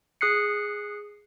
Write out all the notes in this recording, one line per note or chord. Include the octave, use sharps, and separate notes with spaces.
G#4 D#6 F#6 C7 C#7